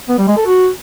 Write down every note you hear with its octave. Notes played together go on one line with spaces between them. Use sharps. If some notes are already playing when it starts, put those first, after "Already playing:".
B3
G3
G#3
A4
F#4